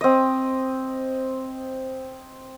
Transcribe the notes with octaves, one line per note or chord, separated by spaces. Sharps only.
C4 D#5